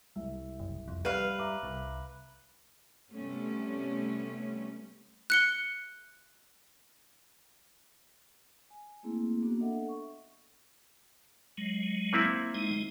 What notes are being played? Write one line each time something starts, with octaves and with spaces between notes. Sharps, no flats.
C2 E5
F#1
F2
G3 B4 F5
E5 A#5 D6
C2
C3 G3 A3 B3 C#4
F#6 C#7 G7
G#5
A3 A#3 C4 E4 G#4
A#3 B3 D4 F#4
D4 A4 D#5 E5 F#5
C#6
F#3 G#3
A#3 C4 E4
G#3 D#4